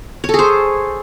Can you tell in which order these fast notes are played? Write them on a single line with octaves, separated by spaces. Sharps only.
C#5 A4 G#4 C5